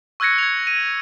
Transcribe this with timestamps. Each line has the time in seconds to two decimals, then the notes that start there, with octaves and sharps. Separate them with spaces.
0.20 C#6 E6 F#6 G#6 A#6 C#7
0.38 G#6 F7
0.67 D#7